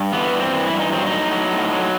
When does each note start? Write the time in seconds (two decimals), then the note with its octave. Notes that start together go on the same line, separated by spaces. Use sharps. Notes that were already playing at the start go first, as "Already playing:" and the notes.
Already playing: G2
0.12 E3 B3
0.33 G2
0.40 C4
0.53 E3
0.66 E4
0.73 G2
0.79 D#4
0.92 F#3 C4
1.06 D#4
1.12 A2
1.31 F#3
1.51 A2
1.71 F#3